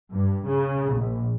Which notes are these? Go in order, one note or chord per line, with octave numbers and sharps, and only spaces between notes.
G2
C#3
A#1